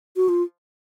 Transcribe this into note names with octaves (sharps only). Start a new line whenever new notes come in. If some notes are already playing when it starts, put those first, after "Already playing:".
F#4
F4